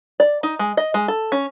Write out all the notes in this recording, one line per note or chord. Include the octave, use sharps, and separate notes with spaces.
D5
D#4
G#3
D#5
G#3
A4
C#4